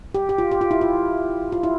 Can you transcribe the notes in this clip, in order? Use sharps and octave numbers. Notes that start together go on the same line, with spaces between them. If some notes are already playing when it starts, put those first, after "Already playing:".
G4
G4
F4
G4
F4
E4
F4
F4
E4